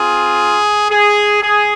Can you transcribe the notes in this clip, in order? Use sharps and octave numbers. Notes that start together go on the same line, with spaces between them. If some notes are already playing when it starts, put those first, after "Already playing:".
Already playing: C4 F4 G#4
G#4
G#4